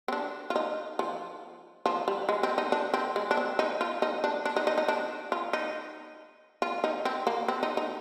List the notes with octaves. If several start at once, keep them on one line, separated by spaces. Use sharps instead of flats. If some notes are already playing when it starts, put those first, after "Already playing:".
C4
D4
F4
D#4
F3
F3
G3
G#3
C4
D#4
D4
C4
G#3
D4
C4
D#4
F4
D#4
D4
D4
D#4
D#4
D#4
D4
F4
D#4
F4
D#4
C4
A#3
C4
D#4
D#4